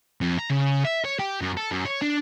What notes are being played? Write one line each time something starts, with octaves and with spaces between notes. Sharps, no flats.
F2
A#5
C#3
E5
C#5
G4
F#2
A4
F#2
C#5
D4